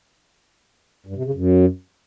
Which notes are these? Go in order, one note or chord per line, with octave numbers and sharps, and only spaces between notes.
G2
C3
C#3
F#2